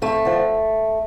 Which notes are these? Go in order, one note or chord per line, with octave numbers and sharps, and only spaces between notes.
F2 A3
D3 F3